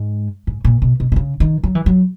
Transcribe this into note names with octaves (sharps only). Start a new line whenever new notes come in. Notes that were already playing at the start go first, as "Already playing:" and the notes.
Already playing: G#2
G#2
A#2
B2
B2
B2
C#3
D#3
F#3
E3
F#3